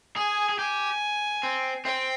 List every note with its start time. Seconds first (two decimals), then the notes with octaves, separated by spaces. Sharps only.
0.16 G#4 G#5
0.49 G#4
0.59 G4 G#5
1.43 C4
1.85 C4 G5